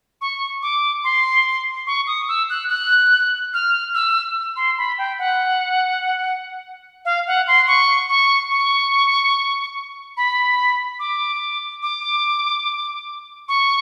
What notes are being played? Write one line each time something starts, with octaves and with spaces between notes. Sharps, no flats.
C#6
D6
C6
C#6
D#6
E6
F#6
F#6
F6
E6
C6
B5
G5
F#5
F5
F#5
C6
C#6
C#6
C#6
B5
D6
D6
C#6